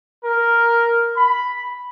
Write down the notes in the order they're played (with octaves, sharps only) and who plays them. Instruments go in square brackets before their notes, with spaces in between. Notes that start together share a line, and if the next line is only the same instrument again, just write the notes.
[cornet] A#4
B5